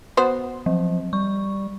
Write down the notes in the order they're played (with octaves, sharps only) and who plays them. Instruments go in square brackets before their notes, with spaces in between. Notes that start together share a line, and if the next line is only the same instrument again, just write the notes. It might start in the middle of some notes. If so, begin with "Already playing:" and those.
[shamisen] B3 F#4 C5
[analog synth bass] F3 [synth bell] F#3
[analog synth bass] G3 [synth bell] C#6